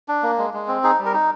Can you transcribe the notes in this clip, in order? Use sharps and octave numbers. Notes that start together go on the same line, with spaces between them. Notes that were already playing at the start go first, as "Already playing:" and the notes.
D4
A#3
G#3
G#3
C4
D#4 G#4
G3
A#4
D#4